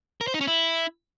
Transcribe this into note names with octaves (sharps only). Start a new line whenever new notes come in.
A#4
C5
D#4
C#4
E4